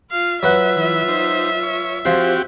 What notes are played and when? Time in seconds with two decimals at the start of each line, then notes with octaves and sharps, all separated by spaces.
0.11 F4 F5
0.43 F#3 F4 B4 E5 F#5
0.76 E3
1.09 D#4 C5
1.63 C#5
2.05 F3 C4 F#4 G4 C6